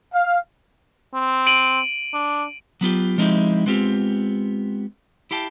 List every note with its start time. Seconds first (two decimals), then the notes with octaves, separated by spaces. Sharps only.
0.12 F5
1.14 C4
1.47 D7 D#7 F#7
2.13 D4
2.81 F#3 B3 F4 G4
3.18 F3 G#3 C4 D#4 E4 G4
3.66 G#3 B3 C4 F4 G4
5.31 E4 G4 F5 G5 A5